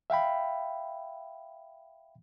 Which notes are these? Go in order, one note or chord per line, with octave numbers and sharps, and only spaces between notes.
E5 F5 G5 B5